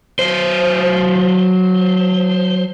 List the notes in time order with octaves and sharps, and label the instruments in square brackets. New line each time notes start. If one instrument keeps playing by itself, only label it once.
[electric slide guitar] F#3 C5